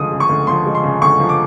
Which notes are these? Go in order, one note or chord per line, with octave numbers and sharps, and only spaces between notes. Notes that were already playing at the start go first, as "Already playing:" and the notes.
Already playing: D2 C#3 F3 G#3 D#6
C#3
C#6
D2
F3 C6
G#3
C6
C#3
D2 C#6
F3
D6